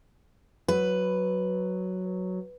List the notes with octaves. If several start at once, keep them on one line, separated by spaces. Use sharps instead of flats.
F#3 B4